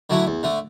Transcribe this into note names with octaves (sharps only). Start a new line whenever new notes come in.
D3 F#3 A3 E4
E2
D3 A3